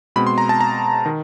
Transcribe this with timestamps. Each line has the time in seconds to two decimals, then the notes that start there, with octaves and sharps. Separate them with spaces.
0.16 B2 G#3 C4 B5
0.27 C6
0.38 A#5
0.49 A5
0.60 A#5
1.06 D#3